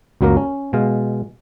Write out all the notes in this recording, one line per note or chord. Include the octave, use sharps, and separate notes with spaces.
C#2 F#2 F#3 A#3 A#4
C#4
B2 G#3 F5